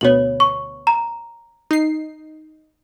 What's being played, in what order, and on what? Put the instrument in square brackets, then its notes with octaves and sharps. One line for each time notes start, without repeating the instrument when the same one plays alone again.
[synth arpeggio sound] D2 B2 B3 [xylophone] C#5 F#7
[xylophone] C#6
A#5
[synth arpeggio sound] D#4 C7